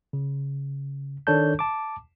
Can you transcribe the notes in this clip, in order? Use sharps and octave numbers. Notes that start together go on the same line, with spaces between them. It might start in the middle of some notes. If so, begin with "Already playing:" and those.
C#3
D#3 D4 A4 C#5 A5 G6
A5 D6